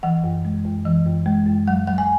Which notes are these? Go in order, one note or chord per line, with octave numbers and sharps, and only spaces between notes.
E3 F#5
F#2
G#3
F#2
E3
F#2
G#3
F#2
F#3 F#5
F#3 F#5
G#5